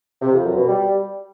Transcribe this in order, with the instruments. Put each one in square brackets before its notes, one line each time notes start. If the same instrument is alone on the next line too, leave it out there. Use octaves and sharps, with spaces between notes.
[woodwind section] C3
F2
F#2
B2
G3